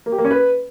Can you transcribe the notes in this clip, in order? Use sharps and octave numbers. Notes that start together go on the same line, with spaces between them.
A#3
G4
A#3
C#4
B4